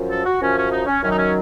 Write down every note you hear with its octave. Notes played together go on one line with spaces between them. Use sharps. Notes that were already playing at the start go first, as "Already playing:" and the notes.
Already playing: F#2 F3
A4
F#4
F#2 F3 C#4
C#4
D#4
C#4
F#2 D#3 F#3 C#4
D#4
C#4